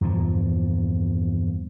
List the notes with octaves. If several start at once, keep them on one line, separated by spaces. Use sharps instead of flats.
E2 G2 A#2 F3